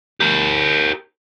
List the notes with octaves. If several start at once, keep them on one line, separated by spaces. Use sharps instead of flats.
G4 A#4